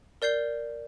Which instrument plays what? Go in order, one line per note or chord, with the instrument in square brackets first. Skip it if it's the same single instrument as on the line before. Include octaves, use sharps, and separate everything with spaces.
[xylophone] A#4 D5 G6 C7 G7